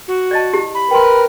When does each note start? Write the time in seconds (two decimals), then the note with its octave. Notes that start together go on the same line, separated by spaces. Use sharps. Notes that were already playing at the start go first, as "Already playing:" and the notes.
0.08 F#4
0.31 D5 D#5 A5
0.53 E4 G4
0.75 B5
0.91 A#4 B4 G5 C6